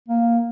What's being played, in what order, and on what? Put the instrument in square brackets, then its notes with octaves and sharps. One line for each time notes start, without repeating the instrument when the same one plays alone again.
[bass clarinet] A#3